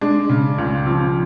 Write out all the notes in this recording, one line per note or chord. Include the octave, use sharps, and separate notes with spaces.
G#3 D4
C#3
C#2
F3